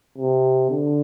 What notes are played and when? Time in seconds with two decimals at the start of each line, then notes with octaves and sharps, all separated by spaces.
0.18 C3
0.70 D3